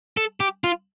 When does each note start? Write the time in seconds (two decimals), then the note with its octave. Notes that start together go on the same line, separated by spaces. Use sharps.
0.17 A4
0.40 G4
0.64 F4